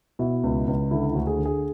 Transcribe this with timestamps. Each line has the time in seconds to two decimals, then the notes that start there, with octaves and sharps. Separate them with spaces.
0.19 B2 E4
0.43 C#2
0.67 C#2
0.91 D3 E4
1.10 E4
1.15 D2
1.27 G#4
1.39 D3
1.45 G#4